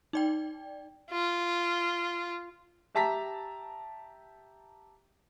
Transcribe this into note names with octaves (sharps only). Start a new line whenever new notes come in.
D#4 D5 G5
F4
G4 E5 A5 A#5 B6